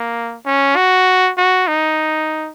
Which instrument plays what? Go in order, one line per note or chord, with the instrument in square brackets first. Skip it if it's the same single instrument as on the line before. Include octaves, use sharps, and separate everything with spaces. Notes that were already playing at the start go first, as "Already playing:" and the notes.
Already playing: [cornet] A#3
C#4
F#4
F#4
D#4